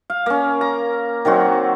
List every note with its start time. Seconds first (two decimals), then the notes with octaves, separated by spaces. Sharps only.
0.10 F5
0.26 A#3 C#4
0.61 A#5
1.25 D#3 F#3 C4 F#4